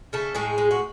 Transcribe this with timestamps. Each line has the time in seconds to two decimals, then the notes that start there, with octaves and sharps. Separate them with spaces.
0.13 C#3 A3 A4
0.35 A2 G#3 G#4
0.58 G#3
0.71 F#4